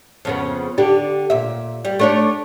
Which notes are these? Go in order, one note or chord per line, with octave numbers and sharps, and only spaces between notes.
F2 C#3 B3
D3 D4 G4
A#2 E5
G3
A3 D4 C#5